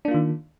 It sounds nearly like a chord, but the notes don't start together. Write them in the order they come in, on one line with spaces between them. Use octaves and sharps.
D4 A#3 F4 D#3